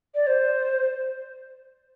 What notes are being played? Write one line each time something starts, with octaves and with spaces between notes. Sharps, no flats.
D5
C5